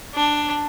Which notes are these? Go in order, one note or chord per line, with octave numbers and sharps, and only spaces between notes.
D4